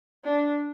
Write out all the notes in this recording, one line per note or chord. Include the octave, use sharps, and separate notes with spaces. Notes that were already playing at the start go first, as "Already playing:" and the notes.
D4